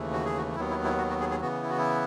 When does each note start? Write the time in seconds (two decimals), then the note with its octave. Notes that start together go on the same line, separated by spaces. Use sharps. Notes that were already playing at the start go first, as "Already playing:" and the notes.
Already playing: D#2 C#3 E3 A3
0.12 F#4
0.25 G#4
0.37 F#4
0.56 D#2 D#3 F#3 B3 E4
0.71 E4
0.84 E4
0.98 F#4
1.10 F#4
1.20 G#4
1.31 G#4
1.41 C#3 E3 B3 F#4
1.62 E4
1.70 F#4
1.78 E4